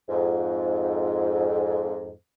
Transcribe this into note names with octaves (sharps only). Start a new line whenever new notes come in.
F2 G#2